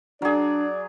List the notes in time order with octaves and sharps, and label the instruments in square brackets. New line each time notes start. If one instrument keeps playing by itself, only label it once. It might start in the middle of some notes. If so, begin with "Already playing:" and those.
[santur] F#3 G#4 [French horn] D4 [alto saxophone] D5